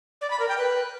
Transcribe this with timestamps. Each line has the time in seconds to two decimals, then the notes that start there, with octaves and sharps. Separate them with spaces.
0.21 D5
0.30 B5
0.40 A#4
0.49 G5
0.58 B4